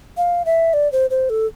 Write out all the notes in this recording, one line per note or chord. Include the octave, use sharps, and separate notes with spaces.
F5
E5
D5
C5
C5
A4